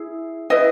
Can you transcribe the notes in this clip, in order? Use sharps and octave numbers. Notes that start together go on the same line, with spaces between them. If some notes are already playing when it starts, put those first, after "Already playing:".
Already playing: E4 G#4
E4 B4 D#5